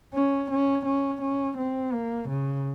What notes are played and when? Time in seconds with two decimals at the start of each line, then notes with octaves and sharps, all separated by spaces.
0.14 C#4
0.50 C#4
0.85 C#4
1.21 C#4
1.58 C4
1.93 A#3
2.29 C#3